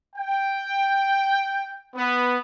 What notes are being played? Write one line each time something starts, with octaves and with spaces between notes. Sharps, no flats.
G5
B3